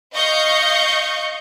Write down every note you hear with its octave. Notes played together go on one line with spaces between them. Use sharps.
D#5 F5 C#6 G6 C#7